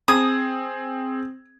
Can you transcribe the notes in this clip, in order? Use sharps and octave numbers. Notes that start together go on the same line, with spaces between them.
C4 G#4 D#6 G#6